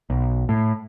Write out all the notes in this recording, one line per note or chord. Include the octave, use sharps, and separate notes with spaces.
B1
A2